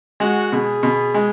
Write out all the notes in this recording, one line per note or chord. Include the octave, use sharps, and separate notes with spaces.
G#3 F#4
B2 G#4
B2
G#3